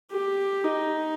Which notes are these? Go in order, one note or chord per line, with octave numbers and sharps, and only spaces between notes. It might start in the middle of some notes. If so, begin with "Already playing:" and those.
G4
D#4